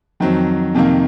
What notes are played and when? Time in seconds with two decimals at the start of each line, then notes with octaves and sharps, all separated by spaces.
0.20 F2 D#3 F#3 C4
0.75 F2 C3 D#3 A#3